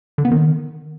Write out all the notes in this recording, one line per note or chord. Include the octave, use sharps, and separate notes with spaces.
D3
B3
D#3